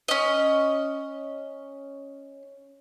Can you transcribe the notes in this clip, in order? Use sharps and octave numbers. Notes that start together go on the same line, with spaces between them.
C#4 D#5